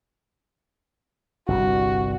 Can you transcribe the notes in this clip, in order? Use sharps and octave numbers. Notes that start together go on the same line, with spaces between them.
G1 C2 G2 F#4